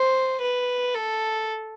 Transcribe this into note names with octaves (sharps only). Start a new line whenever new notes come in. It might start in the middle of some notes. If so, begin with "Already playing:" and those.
Already playing: C5
B4
A4